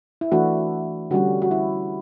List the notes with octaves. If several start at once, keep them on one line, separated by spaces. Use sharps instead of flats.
E4
E3 A3 D4 F#4
D3 G3 C#4 F#4
F#4
E4